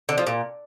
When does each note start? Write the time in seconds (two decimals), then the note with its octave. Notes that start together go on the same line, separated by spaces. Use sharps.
0.09 D3
0.18 F3
0.27 A#2